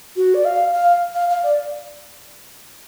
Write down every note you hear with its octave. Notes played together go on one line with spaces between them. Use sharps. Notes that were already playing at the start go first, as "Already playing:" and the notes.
F#4
D5
F5
F5
F5
F5
D5